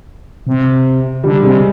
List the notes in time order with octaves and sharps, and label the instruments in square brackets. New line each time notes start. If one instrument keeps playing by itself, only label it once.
[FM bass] C3
[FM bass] D3 [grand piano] G3
[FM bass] C3 [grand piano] G#3